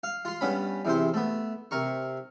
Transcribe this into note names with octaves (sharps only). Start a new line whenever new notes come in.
F5
F4 C6
G2 B3 C#4 B5
E2 C3 C5
A3 B3
C3 A#4 C#6